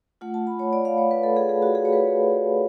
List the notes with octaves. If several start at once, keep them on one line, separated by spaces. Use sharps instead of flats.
A3 F4 F#5
A5
B5
C#5
D5
F5
C#5
B4
A4
G#4
G#4
F#4
G#4
C#5
B4